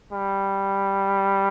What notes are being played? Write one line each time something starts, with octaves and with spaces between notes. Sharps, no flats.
G3